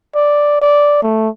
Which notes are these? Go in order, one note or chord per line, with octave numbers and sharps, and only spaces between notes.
D5
D5
A3